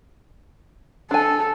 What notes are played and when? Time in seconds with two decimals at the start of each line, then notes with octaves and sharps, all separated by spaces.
1.11 D4 A4 G#5